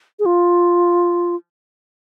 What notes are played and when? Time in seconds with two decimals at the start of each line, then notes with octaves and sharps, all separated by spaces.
0.19 G#4
0.26 F4